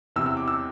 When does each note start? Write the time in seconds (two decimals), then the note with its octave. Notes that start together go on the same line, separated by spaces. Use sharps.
0.16 E2 C3 E3 E6
0.26 E6
0.37 D6
0.48 E6